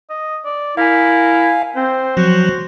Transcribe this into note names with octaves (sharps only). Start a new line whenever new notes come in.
D#5
D5
E4 A#4 F5 G#5
C4 C5
F3 F#3 F#4